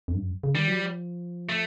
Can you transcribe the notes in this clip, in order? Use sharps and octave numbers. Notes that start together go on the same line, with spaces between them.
F2
G2
F#2
C#3
D#3 G3
F#3
F3
A3